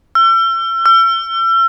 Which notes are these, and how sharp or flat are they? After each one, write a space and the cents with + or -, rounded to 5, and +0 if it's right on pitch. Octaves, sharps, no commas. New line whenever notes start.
E6 +40
E6 +40